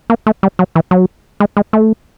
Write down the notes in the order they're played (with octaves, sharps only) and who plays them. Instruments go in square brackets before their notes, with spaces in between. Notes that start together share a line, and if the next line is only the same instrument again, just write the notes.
[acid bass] A#3
A3
G3
F#3
E3
F#3
G#3
G#3
A3